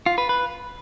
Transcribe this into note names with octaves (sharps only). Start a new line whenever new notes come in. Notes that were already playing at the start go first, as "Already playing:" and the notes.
F4
B4
B4